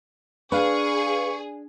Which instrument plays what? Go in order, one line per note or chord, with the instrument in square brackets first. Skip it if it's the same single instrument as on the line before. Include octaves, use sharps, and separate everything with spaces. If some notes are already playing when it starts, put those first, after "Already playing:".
[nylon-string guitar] D4 [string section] G#4 [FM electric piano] B4 F5 [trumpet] C#6